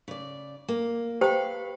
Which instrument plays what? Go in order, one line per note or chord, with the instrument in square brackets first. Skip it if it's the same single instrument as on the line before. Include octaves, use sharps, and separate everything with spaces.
[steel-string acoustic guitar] C#3 D5
A#3
[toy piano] G4 C5 G5 [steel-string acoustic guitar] B4 F5